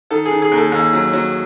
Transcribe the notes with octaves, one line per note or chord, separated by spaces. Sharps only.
D#3 A4
G#4
D#3
G#4
D#2
A4
D#2
F#3
F#3